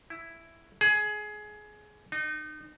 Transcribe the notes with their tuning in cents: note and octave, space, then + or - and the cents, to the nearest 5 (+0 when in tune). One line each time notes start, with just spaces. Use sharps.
E4 +5
G#4 +20
D#4 -30